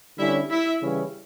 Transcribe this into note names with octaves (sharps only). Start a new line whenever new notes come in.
D3 G3 C#4 E4 E5
E4 E5
C#3 E3 G3 C#4 E4